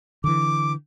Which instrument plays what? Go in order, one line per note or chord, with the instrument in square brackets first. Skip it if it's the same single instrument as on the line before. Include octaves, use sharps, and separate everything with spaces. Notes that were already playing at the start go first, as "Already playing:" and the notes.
[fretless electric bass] D3 E3 [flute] D6